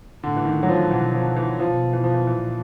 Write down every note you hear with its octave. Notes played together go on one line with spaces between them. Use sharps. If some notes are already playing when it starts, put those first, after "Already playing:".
A2 D3
E3
D#3
F#3
F3
B2 E3
F3
E3
B2 F3
E3
F3
E3
A#2 E3